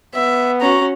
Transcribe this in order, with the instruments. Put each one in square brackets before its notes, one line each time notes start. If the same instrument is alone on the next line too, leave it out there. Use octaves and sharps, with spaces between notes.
[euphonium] B3 [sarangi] E5
[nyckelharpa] C#4 F#4 [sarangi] A#5